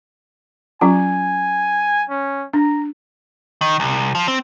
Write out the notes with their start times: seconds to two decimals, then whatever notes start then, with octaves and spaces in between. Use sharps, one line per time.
0.81 F#3 C#4 F4 G#5
2.10 C#4
2.54 D4 A#5
3.61 D#3
3.80 C2
4.15 F3
4.28 C4